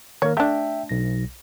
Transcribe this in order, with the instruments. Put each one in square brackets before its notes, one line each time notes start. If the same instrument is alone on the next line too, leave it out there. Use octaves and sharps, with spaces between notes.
[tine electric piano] D#3 A#3 A#4 [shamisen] C#5
[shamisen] A3 D4 [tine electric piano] E5 G5
[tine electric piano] B1 A#6